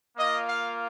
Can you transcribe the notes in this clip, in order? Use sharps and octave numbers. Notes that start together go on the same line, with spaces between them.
A#3 F4 D#5
F5